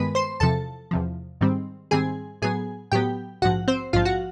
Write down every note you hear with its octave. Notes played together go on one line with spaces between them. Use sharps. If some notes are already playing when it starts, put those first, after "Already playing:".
Already playing: G2 D#3 G#3 B3 A#4 B4 B5
C5 C6
E2 C3 F3 A4 A5
E2 C3 F3
G#2 D#3 G3 C4
G#2 D#3 G3 C4 G#4 G#5
A2 F#3 B3 G#4 G#5
A2 F#3 B3 G4 G5
A#1 G#2 F3 F#4 F#5
C4 C5
A#1 G#2 F3 F4 F5
F#4 F#5